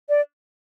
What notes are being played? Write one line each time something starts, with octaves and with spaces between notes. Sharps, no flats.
D5